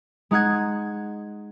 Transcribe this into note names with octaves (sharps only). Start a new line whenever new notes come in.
G#3 D#4 F#5 F#6 G#6